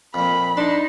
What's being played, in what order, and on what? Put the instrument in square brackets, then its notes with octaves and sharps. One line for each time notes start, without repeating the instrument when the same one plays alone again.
[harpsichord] F2 A#2 [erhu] B5
[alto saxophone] D4 [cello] D#4 [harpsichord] C6